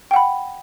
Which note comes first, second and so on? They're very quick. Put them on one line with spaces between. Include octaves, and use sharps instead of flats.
G5 F#5 B5